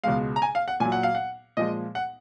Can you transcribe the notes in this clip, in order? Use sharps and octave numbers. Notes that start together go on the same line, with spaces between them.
C#2 B2 G#3 F5
A#5
G#5
F5
F#5
A#2 F#3 G#5
F#5
F5
F#5
A#2 F3 G#3 D#5
F#5